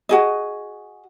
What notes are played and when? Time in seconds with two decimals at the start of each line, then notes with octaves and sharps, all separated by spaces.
0.09 F#4 G#4 D#5